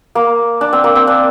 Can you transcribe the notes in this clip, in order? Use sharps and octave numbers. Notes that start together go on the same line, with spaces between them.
A#3
D4
C4
A#3
C4
D4